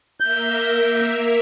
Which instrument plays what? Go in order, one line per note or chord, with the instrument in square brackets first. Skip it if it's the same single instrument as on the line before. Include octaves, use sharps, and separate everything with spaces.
[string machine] A#3 A#4 E5 [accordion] G6